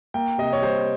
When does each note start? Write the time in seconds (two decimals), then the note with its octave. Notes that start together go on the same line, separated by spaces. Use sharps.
0.14 A#3 G5
0.38 C3 D#5
0.53 C#5
0.62 G3 C5